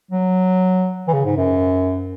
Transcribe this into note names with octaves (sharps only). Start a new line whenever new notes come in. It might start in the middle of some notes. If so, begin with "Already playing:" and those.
F#3
E3
C#3
G#2
F#2